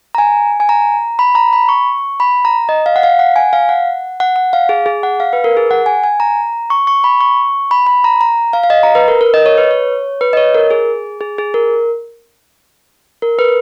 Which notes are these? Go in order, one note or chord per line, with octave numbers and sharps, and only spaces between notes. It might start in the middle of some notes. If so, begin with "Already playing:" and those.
A#5
G#5
G#5
A#5
B5
A#5
B5
C#6
B5
A#5
D#5
F5
F#5
F5
F#5
G#5
F5
F#5
F#5
F#5
F5
G#4
G#4
F#5
F5
B4
A#4
G#4
F#5
G#5
G#5
A#5
C#6
C#6
B5
C#6
B5
B5
A#5
A#5
F5
F5
D#5
A#5
B4
A#4
A#4
D#5
C#5
B4
C#5
B4
D#5
C#5
A#4
G#4
G#4
G#4
A#4
A#4
B4